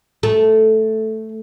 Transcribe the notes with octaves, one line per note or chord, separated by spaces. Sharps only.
A3